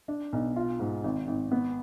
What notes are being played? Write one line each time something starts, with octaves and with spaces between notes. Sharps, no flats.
D4
B1
F4
G#2
G#1
G#1
B3